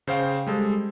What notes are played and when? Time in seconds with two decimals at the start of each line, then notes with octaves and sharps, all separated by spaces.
0.07 C#3 C5 F5 G5
0.47 G3 G#3 A4